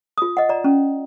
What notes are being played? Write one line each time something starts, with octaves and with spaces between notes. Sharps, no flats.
F4 D#6
D#5 F#5
D5 A#5
C#4